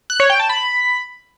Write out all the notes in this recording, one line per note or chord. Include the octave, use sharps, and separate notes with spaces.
F#6
C#5
G5
A5
B5